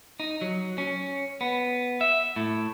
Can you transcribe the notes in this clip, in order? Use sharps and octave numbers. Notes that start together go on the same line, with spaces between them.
D#4
F#3
C#4
B3
E5
A2